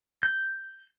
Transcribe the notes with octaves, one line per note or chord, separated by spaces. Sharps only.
G6